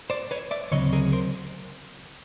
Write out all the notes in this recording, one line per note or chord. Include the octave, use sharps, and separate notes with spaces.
C5 D5
B4 C#5
D5 E5
D2 C#3 F#3 C4 C#5 D#5
G#4 A#4
A#4 C5